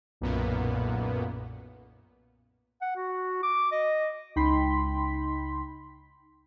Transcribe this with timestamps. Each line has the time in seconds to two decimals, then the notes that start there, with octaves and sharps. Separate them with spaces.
0.21 B1 F#2 A#2 B3
2.81 F#5
2.96 F#4
3.43 D6
3.72 D#5
4.36 C#2 D#4 G5 B5 C6 B6